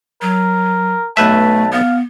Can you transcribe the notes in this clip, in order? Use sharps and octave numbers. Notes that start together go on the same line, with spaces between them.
F#3 A#4
B1 A3 B4 E5 A5
B3 F5